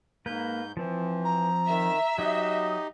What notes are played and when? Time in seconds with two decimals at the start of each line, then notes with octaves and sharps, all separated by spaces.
0.26 G#2 A#3 B4 G6
0.77 E3 F3 C4
1.24 A#5
1.68 D#3 E5
2.18 F#3 D#4 F#4 G4 D#5 D#6